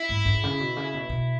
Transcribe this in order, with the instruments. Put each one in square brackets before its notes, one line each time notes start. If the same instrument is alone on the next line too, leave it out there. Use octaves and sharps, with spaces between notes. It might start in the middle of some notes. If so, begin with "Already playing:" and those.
Already playing: [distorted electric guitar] E4
[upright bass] G#2
G#2
C#3
B2
C#3
B2
B2